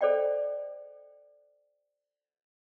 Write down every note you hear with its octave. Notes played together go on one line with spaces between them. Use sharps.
A4 C5 D5 D#5 G5